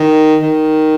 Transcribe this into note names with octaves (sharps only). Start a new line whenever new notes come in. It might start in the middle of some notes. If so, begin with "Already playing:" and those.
Already playing: D#3
D#3